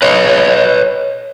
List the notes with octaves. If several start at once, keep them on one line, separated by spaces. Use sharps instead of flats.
B4 C#5 D#5